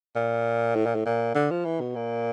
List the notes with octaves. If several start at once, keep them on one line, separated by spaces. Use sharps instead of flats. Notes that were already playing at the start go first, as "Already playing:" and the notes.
A#2
A2
A#2
A2
A#2
D3
F3
E3
B2
A#2